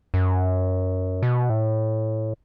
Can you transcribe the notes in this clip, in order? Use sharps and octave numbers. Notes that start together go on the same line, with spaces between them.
F#2
B2
A2